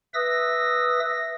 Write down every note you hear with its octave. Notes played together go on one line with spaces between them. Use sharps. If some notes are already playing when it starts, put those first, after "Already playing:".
B4 E5 D#6 E6 A#6